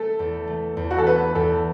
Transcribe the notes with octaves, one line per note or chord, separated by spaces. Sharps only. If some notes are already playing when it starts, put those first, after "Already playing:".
Already playing: A3 A4
E2
A3
E2
F#4
A4
B3 B4
E2 A4